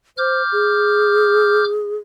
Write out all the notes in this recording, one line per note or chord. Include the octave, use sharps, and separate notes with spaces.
C5 D6 F6 G6
G#4